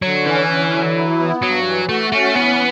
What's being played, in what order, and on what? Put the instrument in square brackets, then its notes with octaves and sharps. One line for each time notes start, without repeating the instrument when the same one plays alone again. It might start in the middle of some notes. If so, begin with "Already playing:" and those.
[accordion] D3 [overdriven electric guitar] F#3
[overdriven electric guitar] E3 [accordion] C#4
[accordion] D3
F#3
E4
B3
[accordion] G2 [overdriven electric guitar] F#3
[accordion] E3
[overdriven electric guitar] A3 [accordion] F#4
[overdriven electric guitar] A3 [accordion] C#4
[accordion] E3 [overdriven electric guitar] B3